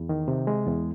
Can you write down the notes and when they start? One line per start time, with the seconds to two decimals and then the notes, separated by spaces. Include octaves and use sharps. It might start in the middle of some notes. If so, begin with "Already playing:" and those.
Already playing: E2
0.09 D#3
0.28 C3
0.47 G#3
0.66 E2